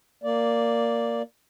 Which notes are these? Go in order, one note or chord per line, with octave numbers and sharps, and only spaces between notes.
A#3 D5